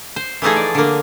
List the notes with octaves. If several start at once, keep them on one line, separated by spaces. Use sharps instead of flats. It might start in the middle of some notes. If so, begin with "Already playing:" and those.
C5
E3 F3 A3 D#4 G#4
D5
D3 A#3